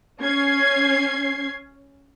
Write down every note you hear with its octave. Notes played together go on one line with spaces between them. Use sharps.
C#4 G#6 C7